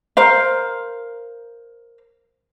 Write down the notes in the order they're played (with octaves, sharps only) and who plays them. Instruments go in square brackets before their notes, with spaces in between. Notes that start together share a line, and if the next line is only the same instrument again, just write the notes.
[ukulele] A#4 C5 F5